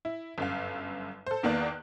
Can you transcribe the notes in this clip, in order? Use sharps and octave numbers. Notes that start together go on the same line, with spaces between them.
E4
G1 F#2 F5
A4 C5
E2 D#3 A#3 B3 D5 F#6